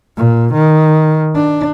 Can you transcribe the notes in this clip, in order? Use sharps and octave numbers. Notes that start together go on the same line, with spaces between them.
A#2
D#3
D4